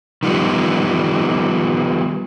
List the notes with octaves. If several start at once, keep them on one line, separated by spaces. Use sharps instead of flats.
D#3 F3 G3 B3